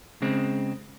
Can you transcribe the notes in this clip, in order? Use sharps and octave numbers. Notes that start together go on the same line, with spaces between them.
C#3 G#3 C4